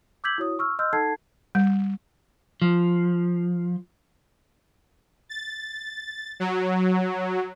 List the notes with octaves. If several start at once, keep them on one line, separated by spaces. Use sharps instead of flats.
D6 E6 G6 G#6 B6 F#7
E4 F#4 C#5 D#6
C#6 E6 F6
D#5 C6 E6 F6 G6
D#4 A4 F#5 A5 G#6 C7
G3
F3
A6
F#3